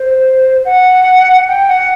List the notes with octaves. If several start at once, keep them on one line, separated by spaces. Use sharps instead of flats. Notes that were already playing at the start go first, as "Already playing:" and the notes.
Already playing: C5
F#5
G5
F#5